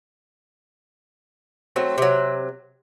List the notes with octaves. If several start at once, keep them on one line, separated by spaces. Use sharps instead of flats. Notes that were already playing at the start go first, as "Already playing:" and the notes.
F#3 A3 C4
C3 F#3